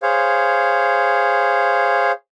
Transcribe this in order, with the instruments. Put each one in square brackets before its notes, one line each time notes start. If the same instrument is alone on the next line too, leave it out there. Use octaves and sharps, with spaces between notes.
[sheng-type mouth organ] G#4 C5 C#5 F5